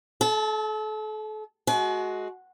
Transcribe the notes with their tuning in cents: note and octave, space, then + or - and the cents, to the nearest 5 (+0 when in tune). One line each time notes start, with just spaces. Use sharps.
A4 -35 A5 +0
G#3 +20 F#4 +0 G#5 +45